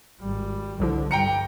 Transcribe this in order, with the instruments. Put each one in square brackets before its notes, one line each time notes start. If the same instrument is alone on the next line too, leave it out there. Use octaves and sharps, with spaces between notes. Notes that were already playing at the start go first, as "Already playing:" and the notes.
[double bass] G#1 G3
[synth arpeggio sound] C2 F3 E4 [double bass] D3
[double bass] G2 G3 [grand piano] G5 A#5 C#7